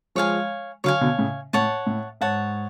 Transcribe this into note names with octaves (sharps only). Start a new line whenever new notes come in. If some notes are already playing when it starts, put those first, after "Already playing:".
F3 G#3 C#5 F5 G#5
D3 F#3 C#5 F5 G#5
B2 D3
A2 C#3
A2 C#5 F#5 A5
A2
G#2 C#5 F#5 A5